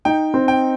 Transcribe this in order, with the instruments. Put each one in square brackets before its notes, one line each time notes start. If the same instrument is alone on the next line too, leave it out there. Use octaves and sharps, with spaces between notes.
[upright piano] D#4 [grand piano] G5
[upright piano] C4
[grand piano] G5